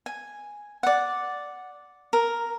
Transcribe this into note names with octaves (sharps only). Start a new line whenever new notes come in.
G#5
D5 F#5
A#4